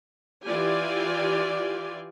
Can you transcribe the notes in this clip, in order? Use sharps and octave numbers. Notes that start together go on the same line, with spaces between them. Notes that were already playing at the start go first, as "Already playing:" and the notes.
E3 F4 G4 D5 G#5